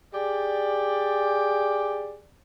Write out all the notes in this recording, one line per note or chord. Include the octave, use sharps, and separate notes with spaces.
G4 G#4 D5